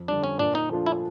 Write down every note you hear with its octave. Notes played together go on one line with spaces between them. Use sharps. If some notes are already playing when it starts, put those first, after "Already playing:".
Already playing: F2
D3 G3 D4
C#4
A#2 D4
D#4
F3 A3 D4 F4
E4